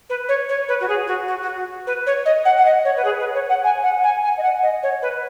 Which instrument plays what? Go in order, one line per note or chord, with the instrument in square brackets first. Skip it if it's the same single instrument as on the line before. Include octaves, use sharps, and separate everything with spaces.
[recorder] B4
C#5
C#5
B4
F#4
G#4
F#4
F#4
F#4
B4
C#5
D#5
F#5
F#5
D#5
C#5
B4
G#4
B4
C#5
F#5
G#5
F#5
G#5
G#5
D#5
F#5
D#5
C#5
B4